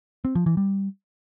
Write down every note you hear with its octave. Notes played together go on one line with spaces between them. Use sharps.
C4
F3
E3
G3